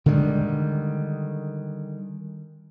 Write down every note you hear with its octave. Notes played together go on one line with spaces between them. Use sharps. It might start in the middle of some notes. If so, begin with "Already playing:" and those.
D3 D#3 G3 G#3